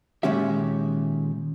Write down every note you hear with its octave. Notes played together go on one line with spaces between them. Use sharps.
A#2 D#3 G#3 C#4 G4 E5